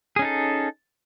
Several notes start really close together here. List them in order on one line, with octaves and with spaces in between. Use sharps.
G#4 C#4 D#4 A4